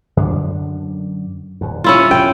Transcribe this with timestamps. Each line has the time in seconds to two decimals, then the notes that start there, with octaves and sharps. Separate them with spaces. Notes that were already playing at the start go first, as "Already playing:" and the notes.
0.17 F#2 D3 D4
1.61 D#1 D#2
1.84 C#4 E4 F4
2.11 E1 A2 F#3 G5